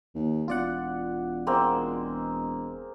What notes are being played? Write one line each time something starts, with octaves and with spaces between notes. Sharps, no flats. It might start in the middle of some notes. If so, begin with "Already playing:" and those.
D#2
E1 F4 D5 F#5
G#3 A#3 C4